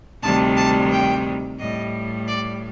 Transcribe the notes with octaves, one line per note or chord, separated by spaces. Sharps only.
D2 C3 D#3 G3 A5
A5
G5
A2 G3 D#5
D5